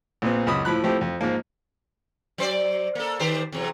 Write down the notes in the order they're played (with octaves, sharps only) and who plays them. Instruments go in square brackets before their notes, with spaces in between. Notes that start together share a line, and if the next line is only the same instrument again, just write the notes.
[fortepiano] A#1 A#2 B3 C4
C#2 F#2 B5 D#6
A2 F3 B5 F#6
F3 A3 C4 E4 G4
F2
G#2 F3 A#3
[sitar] F#3 C5 D5
A#3 A4
D#3 G4 C5
E2 C3 F#3